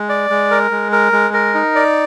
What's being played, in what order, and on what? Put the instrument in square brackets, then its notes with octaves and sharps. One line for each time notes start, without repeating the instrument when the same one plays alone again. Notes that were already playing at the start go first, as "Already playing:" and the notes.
Already playing: [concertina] G#3
D5
G#3
A#4
G#3
A#4
G#3
A#4
D#4
D5